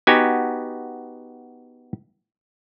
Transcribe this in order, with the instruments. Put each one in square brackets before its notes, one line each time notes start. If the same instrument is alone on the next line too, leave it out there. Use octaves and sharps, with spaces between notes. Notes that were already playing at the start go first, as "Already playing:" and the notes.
[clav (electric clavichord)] B3 D#4 F#4 G4 G#5